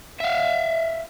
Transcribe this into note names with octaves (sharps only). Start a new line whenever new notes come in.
E5 F5